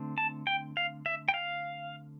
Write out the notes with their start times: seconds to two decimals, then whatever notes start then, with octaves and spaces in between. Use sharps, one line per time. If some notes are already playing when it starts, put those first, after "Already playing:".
Already playing: D3 A3 C4
0.18 A5
0.47 G5
0.77 F5
1.06 E5
1.29 G5
1.34 F5